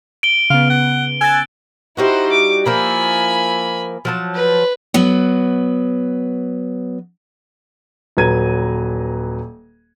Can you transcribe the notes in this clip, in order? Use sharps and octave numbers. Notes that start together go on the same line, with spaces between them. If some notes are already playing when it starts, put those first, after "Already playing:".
D7 G7
C#3 B3 F5
F#5
G#5 E6 F#6 A6
G3 D#4 E4 F#4 C5
D6
F3 A#3 E4 G#5 B5
F3 F#3 A5
B4
F#3 B3
D#1 F#3 B4 A#5 G#6 D#7